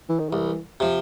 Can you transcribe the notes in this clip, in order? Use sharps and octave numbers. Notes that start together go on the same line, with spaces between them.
E3
D#3
C2 E3
C3 F3